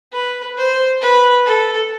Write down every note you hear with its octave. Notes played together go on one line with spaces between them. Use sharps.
B4
C5
B4
A4